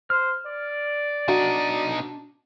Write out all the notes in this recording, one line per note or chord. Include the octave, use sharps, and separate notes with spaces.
C5 F6
D5
B2 D4 D#4 F#4